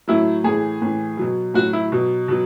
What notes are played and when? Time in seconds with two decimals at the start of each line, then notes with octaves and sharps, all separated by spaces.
0.08 A2 F#3 E4
0.44 A2 E3 G#4
0.82 A2 E3
1.17 B2 F#3
1.54 A2 F#3 F#4
1.73 E4
1.92 B2 F#3
2.28 B2 F#3